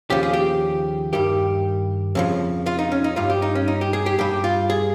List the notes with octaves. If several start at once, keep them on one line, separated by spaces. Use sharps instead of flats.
D#2 C#3 F3 G4
G#4
G4
G2 D#3 G3 G4
F2 C#3 F3
F4
D#4
C#4
D#4
G2 G3 F4
G4
D#4
C#4
D#4
G4
G#4
G4
G2 G3 G4
F4
G#4